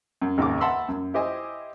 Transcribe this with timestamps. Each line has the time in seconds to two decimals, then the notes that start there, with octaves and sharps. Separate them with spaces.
0.22 F#2
0.38 G#1 D#2 C#3 D6
0.61 E5 F#5 A5 B5 C6 E6
0.88 F#2
1.14 E4 G4 C5 D#5 G#5